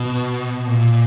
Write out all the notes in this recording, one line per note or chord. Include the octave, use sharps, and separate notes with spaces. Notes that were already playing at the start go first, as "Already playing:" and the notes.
Already playing: B2
A#2